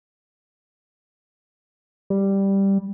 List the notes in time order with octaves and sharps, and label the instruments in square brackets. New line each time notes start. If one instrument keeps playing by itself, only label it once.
[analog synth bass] G3